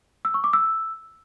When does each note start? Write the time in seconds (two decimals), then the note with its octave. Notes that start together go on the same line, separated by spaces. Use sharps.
0.25 E6
0.34 C#6
0.44 D6
0.53 E6